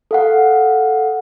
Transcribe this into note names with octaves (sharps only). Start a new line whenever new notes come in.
A4 F5 F#5